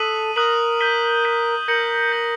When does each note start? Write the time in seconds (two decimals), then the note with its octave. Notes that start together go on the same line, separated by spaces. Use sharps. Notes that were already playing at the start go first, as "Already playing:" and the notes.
Already playing: A4 D#6 F#6 B6 D#7 F#7
0.36 A#4 D#6 F#6 B6 D#7 F#7
0.80 G6 B6 D#7 G7
1.24 G6 B6 D#7 G7
1.68 A#4 G6 A#6 C#7 F#7
2.12 G6 A#6 C#7 F#7